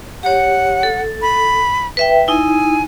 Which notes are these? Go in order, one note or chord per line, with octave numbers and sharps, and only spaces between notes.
G4 C#5 F#5
A4
B5
B4 E5 G5
D#4 E4 G#5